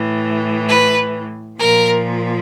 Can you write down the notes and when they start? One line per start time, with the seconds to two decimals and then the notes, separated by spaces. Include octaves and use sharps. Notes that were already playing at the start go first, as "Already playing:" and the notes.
Already playing: A2 E3
0.67 B4
1.59 A#2 F3 A#4